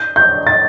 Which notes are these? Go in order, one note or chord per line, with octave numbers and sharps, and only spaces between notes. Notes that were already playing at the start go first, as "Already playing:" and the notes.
Already playing: G6
G6
A6